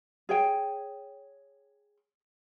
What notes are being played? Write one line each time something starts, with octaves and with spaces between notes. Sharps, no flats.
G#4 C#5 G5